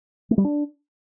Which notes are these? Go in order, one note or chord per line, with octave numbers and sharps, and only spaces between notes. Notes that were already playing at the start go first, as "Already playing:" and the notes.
A3
G3
D4